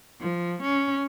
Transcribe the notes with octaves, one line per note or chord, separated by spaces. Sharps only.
F3
C#4